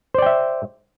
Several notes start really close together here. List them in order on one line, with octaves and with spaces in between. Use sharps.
C5 D5 G5 E5